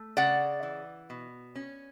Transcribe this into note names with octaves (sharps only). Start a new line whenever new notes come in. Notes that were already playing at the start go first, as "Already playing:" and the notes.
Already playing: A3
C#3 D5 F#5
E3
B2
C#4